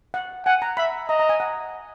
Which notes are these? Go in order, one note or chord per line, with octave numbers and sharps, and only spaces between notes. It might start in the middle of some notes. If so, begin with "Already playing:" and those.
F#5
F#5 G#5
A#5
E5 B5
D#5 A#5
A#5
G#5
F#5